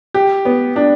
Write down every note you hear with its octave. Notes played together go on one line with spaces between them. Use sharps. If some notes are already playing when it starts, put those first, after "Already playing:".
G4
B3
D4